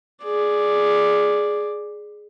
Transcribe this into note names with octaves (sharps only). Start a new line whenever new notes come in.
G#4 D5